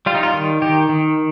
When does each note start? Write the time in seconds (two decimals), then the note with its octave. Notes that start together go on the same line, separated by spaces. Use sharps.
0.06 G3 F4
0.15 D#4
0.23 F4
0.34 D#3
0.62 D#3 G4
0.89 D#3